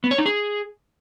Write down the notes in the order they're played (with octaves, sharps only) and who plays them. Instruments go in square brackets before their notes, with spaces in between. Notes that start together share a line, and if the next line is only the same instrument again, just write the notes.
[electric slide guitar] B3
C#5
D#4
G#4